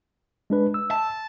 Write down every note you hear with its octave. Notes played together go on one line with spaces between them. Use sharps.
G#3 D4 B4
E6
A5